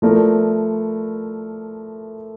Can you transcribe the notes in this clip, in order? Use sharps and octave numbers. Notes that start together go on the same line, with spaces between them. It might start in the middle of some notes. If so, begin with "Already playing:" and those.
F3 A3 E4 A#4 D5